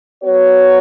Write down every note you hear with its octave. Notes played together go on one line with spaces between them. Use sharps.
F#3 B3 F#4 C#5